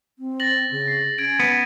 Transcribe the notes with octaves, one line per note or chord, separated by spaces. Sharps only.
C4
A6 A#6 F#7
C#3
C7
C#4 G#6 D7
B3